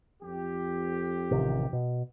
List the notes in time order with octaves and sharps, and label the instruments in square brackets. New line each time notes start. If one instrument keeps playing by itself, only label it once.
[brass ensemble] F2 G4
[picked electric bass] A1 C3 D#3
B2